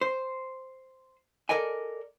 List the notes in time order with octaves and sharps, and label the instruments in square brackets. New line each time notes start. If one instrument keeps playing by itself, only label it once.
[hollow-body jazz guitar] C5
A4 A#4 D5 D#5 G#5